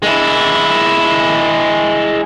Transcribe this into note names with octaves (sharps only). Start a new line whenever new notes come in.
G#3 E4